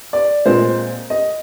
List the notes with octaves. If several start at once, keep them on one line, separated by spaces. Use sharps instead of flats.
D5
A#2 G#3 C4 C5
D#5